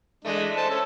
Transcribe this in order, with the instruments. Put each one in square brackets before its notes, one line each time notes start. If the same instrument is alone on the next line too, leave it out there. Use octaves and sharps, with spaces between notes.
[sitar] E3 A3 [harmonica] G#3 D4 D#5
[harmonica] C5 A5
C#4 A4 E5